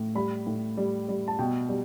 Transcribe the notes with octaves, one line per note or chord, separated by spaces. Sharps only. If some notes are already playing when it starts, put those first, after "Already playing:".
Already playing: A2
G3 B5
A2
G3
G3
A5
B2 G5
G3